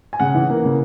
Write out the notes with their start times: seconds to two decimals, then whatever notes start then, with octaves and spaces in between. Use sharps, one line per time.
0.13 G#5
0.20 C#3 F#5
0.35 E3
0.50 A#3
0.64 C#3